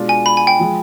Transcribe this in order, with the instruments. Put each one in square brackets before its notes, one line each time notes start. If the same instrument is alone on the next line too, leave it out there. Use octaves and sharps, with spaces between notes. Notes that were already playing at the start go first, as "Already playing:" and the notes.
Already playing: [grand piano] B2 G#3 D4 F4
[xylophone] G#5
B5
G#5
G5
[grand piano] F3 G#3